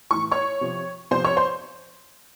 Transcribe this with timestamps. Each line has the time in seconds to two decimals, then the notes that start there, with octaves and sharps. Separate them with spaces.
0.10 A2 E3 C#6
0.32 C#5 C#6
0.61 C3 F3
1.11 C3 F3 C5 C6
1.24 C#5 C#6
1.36 C5 C6